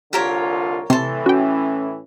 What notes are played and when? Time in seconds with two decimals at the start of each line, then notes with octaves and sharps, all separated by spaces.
0.13 C2 D3 F4 G4 A#4 C#5
0.90 A2 C3 E3 A4 C6
1.26 C#4 F#4 G5